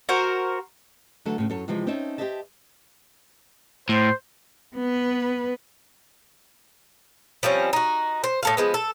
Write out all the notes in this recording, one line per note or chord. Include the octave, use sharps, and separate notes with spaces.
F#4 A#4 C5
D3 E3 F#3 A3 A4
A2 C#3
F#2 A4 C#5
C3 E3 F3 G#3 C4
C4 C#4 D#4 C#5 E5 A5
G4 G#4 C5 D#5 E5 A5
A2 C5
B3 B4
F3 G3 C4 C#4
D#4 F#4
C5
A2 A4 F5
F3 G#3 B3
A4